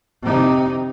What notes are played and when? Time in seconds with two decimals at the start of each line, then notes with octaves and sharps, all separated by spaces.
0.22 C3 D#4